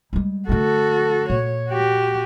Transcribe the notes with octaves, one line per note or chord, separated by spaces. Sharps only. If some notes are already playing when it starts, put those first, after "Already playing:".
G3 G#3
D3 A3 F#4 A4
A#2 C#5
F#4 G4